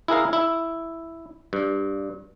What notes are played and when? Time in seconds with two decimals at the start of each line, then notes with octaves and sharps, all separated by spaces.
0.08 E4 G#4 A#4 F5
0.33 E4
1.53 G2